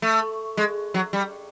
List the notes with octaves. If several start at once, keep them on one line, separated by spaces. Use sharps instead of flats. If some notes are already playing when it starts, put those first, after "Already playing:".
A3
G#3
F#3
G3